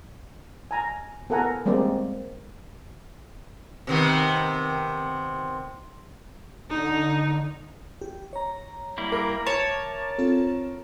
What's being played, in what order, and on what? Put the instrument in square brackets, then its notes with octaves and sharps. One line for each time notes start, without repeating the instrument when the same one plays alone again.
[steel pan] G#5 A#5
B3 A4 A#4 F#5 G#5 A#5
G3 G#3 A#3 C4 D5
[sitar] C3 D#3 B3
[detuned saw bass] D3 [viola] D#4
[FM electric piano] G4
C#5 A#5
[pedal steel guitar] G3 A#3 E4
[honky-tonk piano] A#4 [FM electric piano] E5 D6
[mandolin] C#5 [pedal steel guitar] A5
[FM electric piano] C4 F4 A4